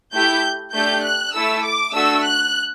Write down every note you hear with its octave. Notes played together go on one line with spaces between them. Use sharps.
A3 E4 G4 G6
A3 D4 G4 G6
F#6
A3 E4 A4 E6
D6
A3 D4 F#4 A4 E6
F#6